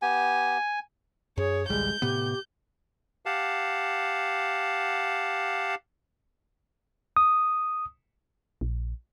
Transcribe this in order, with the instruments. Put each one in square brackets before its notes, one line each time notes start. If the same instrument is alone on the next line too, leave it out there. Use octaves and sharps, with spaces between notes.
[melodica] B3 G4 [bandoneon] G#5
[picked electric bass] F#2 [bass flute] G#4 [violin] C#5
[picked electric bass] A1 D2 G3 [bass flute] G#3 [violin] G6
[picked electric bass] A2 C3 B3 [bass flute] G4
[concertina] G4 F5 F#5 A5
[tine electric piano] D#6
[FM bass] A#1